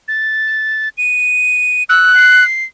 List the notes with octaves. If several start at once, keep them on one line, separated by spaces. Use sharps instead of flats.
A6
D#7
E6 F#6
C7